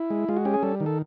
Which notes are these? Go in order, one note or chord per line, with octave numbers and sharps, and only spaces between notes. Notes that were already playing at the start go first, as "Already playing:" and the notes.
Already playing: E4
G#3
G#3 F4
F#4
C#4 G4
G#4
G3 A4
D#3
A4